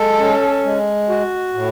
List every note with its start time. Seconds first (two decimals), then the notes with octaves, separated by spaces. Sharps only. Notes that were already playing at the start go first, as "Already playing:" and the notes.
Already playing: G#3 A4
0.20 C#4
0.64 G#3
1.09 F#4
1.54 A2